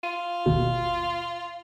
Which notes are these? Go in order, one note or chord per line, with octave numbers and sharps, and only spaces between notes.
F4 D#7
G#1 D#2 B2